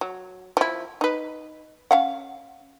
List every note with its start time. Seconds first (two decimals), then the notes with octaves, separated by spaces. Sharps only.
0.01 F#3
0.57 F3 E4
1.01 D#4 B4
1.91 C#4 F5 F#5